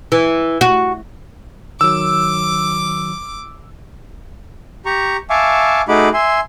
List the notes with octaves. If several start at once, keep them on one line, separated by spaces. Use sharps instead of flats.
E3
F#4
D#3 F#3 D6 E6
G4 A#5 C#6
E5 F5 G#5 A5 C#6 D6
A3 D#4 F#4 G#4 B5 D6
E5 G#5 C6